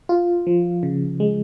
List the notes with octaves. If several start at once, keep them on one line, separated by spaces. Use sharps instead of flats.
F4
F3
C#3
G#3